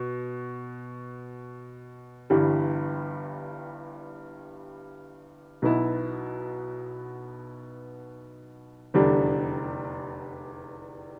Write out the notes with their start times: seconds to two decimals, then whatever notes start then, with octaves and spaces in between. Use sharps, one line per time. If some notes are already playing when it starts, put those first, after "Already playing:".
Already playing: B2
2.30 G1 G2 E3 G3
5.62 B1 B2 B3 E4
8.94 F1 E2 D3 G3 D4